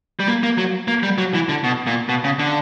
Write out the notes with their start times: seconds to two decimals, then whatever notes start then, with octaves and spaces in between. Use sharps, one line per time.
0.20 G3
0.28 A#3
0.43 A#3
0.58 F#3
0.88 A#3
1.03 G3
1.18 F#3
1.34 E3
1.49 D3
1.64 B2
1.87 A#2
2.09 B2
2.24 C#3
2.39 D3